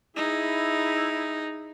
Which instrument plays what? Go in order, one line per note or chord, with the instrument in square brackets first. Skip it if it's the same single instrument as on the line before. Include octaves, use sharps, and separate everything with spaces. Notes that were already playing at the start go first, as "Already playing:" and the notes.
[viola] D#4 G#4 [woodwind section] E4